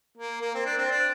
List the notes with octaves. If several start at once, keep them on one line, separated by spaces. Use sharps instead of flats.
A#3
A#3
C4
D4
C4
D4